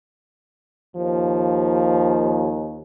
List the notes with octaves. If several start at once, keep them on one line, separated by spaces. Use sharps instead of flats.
D#2 F3